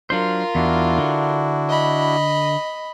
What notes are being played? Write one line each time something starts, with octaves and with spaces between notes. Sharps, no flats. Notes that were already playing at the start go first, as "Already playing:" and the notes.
F#3 D4 F4 A#4 C5
E2 D4 E4 F#4
D3
D#5 B5